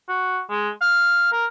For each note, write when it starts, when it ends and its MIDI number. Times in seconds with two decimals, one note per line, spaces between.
0.08 0.40 66
0.50 0.70 56
0.81 1.27 77
1.32 1.46 70